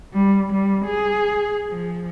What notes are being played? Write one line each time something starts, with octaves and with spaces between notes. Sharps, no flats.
G3
G3
G#4
F3